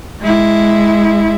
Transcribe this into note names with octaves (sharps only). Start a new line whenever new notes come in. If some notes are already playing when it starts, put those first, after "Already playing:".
G#3 E4